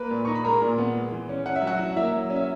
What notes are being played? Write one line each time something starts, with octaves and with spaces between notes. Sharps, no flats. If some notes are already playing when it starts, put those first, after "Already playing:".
Already playing: A#3 B4 B5
A#2
D#4 C#6
B5
G#3 A#4 A#5
A#2
B3
G#3
E3
C#4
C#4 F#5
E5
F#3
F#4 F#5
E4
A#3 E4 E5
F#3
C#4
E5